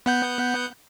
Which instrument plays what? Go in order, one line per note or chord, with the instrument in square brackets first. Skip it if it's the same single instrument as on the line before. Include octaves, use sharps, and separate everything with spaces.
[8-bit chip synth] B3 F#5 G6